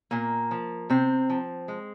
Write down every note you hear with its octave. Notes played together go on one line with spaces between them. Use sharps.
A#2 A#3
F3
C3 C4
F3
G#3